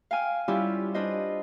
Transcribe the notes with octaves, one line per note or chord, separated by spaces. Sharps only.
F5 G5 G#5 F6
G3 C#4 E4 F4 G4
D4 F4 B4 C5 D#5